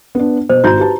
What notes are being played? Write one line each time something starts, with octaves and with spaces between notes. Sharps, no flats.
B3 D4
B2 C5
G#1 E4 F#4 A#5 G6
G4 B4 A5